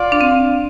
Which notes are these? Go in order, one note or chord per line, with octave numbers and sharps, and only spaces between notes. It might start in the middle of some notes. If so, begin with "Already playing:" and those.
Already playing: F4 D5 F5
D4
C4